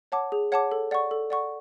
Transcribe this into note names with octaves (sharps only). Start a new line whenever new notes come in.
C#5 F#5 A5 D6
G#4
C#5 F#5 A5 D6
A4
D5 F#5 C#6
A4
D5 F#5 C#6